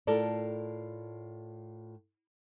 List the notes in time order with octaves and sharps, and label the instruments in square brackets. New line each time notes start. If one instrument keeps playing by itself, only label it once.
[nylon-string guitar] A2 F4 A4 A#4 D5